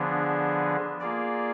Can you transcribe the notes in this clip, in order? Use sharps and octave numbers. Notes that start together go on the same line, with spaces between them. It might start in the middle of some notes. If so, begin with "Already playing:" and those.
Already playing: D3 F3 B3 D4 G#4
A#3 F4 G#4 D5